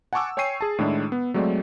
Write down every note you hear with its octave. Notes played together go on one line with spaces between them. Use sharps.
F#5 G#5 A5 C#6 D6 E6
C#5 G5 G#5 C#6 C7 D#7
G#4 A5
A2 D#3 G#3 D4 E4
B3
F#3 G#3 A3 C4 D5